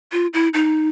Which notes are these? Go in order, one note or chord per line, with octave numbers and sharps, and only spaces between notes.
F4
E4
D#4